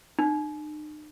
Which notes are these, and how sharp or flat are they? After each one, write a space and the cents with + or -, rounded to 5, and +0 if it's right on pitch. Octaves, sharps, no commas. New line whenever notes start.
D#4 -45